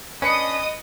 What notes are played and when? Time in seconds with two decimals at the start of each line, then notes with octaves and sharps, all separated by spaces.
0.22 C#4 D4 B4 D#5 B5 D#6 C#7